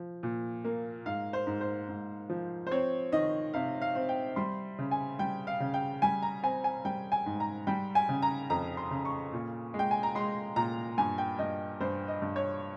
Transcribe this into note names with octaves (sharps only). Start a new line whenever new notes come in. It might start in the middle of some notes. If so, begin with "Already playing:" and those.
Already playing: F3
A#2
A#3
G#2 F5
C5
G#2
C5
G#2
F3
C5
C4 C#5
D#3 D#5
C3 F5
F5
C4
G5
G3 C6
C#3
G#5
G3 G5
F5
C#3
G5
G3 G#5
A#5
C4 G#5
G#5
G3 G5
G#5
G#2
A#5
G3 G5
G#5
C#3
A#5
F2 A#5
C6
C#3
C#6
A#2
G#3
G5
G#5
A#5
G#3 C6
A#2 A#5
G2 G#5
G5
G2 D#5
G2 C5
D#5
G2
C#5